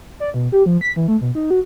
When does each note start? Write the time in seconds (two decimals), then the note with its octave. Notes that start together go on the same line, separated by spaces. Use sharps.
0.20 D5
0.34 B2
0.52 G4
0.66 F3
0.81 B6
0.96 E3
1.08 A3
1.21 B2
1.35 D#4
1.50 F#4